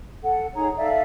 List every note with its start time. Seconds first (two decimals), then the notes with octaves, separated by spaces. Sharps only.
0.22 A4 F#5
0.54 D#4 G#4 C#5 A#5
0.77 A4 D5 E5 F5